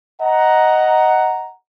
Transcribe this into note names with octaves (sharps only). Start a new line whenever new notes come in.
D#5 F#5 A#5